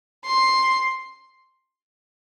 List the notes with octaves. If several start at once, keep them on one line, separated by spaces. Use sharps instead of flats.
C6